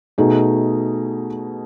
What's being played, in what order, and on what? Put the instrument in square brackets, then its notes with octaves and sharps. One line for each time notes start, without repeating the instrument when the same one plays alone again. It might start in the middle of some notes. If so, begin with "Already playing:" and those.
[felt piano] B2 A3 D#4 G#4